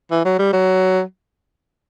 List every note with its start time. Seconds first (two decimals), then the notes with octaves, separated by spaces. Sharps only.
0.11 E3
0.25 F#3
0.39 G3
0.53 F#3